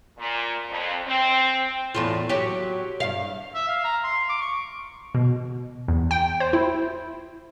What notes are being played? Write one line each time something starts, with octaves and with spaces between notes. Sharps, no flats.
A#2
F2
C4
E2 A2 F4
F#3 G4
G2 F5
E5
F5
A#5
C6
D6
C#6
B2
E2
G5
C5
E4